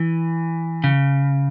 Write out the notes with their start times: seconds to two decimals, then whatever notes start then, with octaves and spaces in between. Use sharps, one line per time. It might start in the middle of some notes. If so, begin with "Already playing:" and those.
Already playing: E3
0.84 C#3